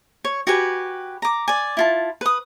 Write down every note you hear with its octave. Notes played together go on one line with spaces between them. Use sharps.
C#5
F#4 G4 B4 G#5
A#5 D6
D5 G#5
E4 F4 A5
B4 D#6